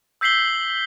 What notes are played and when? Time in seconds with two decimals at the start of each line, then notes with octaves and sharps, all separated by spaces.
0.21 E6 G6 B6 C7 F#7 G7